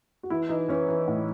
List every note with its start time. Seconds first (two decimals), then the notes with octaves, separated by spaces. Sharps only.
0.23 F#4
0.30 E3 E4
0.49 E3 D#4
0.69 E3 C#4
0.89 E3
1.08 A2